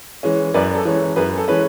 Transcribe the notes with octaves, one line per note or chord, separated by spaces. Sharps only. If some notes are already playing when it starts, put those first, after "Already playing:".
E3 G#3 C#4
F#2 B4 D5
A4
E3 G#3 C#4
F#2 G#4 B4
A4
E3 G#3 C#4 B4